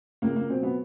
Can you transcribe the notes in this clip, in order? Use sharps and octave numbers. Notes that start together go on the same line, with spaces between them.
C#2 A#3
A#3
B2 F#3 C4
B3